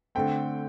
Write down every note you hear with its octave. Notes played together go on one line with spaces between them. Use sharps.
D3 A3 C4 G5